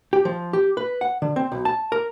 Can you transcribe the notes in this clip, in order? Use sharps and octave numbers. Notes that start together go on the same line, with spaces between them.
G4
F3
G4
B4
F#5
D3
C4
B1
A5
A#4